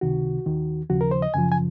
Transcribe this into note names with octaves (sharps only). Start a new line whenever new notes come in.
C#2 C3 D#3 F#4
D#2 D#3
D#2 C#3 F3 F#4
A#4
C5
D#5
F#2 C#3 F3 G#5
G#5